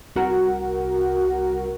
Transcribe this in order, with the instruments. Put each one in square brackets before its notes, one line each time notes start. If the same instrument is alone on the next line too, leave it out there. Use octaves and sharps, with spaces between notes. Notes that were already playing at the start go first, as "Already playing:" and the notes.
[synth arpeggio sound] C2 F#4 A#4